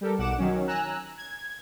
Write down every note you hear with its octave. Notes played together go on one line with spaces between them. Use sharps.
G3 G4 A4 A#4
B1 F#5 D6 E7
D#3 F#3 C#4
G#5 A#5 E6 F#6
G#6